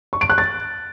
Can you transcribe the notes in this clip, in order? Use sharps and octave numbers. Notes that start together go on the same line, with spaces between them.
C#6
D7
F#6
A6